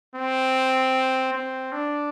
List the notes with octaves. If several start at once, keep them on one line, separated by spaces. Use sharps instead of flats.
C4
C4
D4